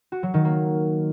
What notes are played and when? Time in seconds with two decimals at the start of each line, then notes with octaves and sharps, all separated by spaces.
0.12 F#4
0.23 F#3
0.34 D#3
0.45 A#3